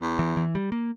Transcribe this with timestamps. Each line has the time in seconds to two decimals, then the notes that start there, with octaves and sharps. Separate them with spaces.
0.02 E2
0.19 E3
0.37 E3
0.55 G3
0.72 A#3